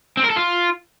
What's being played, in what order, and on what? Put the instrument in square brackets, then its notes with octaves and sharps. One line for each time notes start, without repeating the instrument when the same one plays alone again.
[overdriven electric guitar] C4
A#4
A4
F4